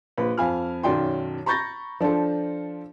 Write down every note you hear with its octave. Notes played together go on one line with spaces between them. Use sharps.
A#1 B4
F2 F5 G#5 B5 F6
B1 F#2 D#3 D5 G5 C6
A#5 B5 C#6 G6 A6 A#6
F3 D4 F4 A4